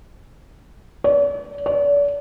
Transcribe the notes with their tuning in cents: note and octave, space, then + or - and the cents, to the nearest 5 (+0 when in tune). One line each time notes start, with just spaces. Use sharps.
D5 -45
D5 -40